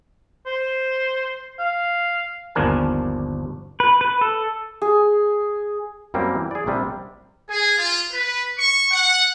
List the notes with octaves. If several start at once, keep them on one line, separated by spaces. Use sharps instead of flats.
C5
F5
G1 D#2 F3 D4 A#4 G#5
B4
B4
A4
G#4
F#2 G3 A#3 C4
E3
G#4 D5
A#1 C3 G3
G#4
F4
B4
C#6
F#5